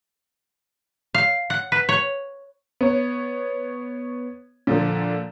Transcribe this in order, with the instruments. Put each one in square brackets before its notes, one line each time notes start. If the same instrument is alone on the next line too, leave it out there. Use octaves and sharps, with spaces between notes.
[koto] F5
F#5
B4
C#5
[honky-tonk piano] B3 C#5
A#2 D3 F3